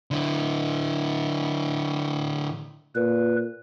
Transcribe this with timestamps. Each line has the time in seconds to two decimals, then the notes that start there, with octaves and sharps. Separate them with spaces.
0.11 D3 E4
2.95 A#2 B4